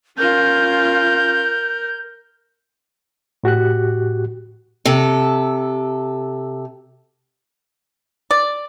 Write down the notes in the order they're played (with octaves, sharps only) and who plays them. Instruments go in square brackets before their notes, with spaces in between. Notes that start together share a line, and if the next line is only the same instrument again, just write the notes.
[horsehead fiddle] C#4 F4 [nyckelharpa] A#4 [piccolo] G6
[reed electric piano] A2 F#4 G4 F#6
[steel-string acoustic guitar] C3 A4
[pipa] D5